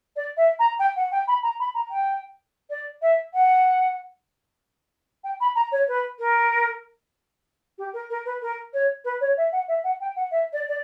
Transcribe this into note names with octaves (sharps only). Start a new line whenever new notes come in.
D5
E5
A#5
G5
F#5
G5
B5
A#5
B5
A#5
G5
D5
E5
F#5
G5
B5
A#5
C#5
B4
A#4
G4
A#4
A#4
B4
A#4
C#5
B4
C#5
E5
F#5
E5
F#5
G5
F#5
E5
D5
D5